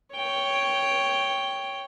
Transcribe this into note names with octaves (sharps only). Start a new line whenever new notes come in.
C#5 G5